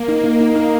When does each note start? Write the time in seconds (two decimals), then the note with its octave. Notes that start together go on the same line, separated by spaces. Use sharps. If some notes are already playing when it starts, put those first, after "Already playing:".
Already playing: A#3
0.08 D#4
0.24 D#4
0.41 D#4
0.56 D#4